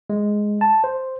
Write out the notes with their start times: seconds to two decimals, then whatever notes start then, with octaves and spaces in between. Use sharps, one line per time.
0.10 G#3
0.61 A5
0.84 C5